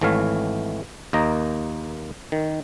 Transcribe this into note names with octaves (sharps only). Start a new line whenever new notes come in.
G#1 E3 A3 C#5 F5
D#2 A#3 D#5 A#5
D#3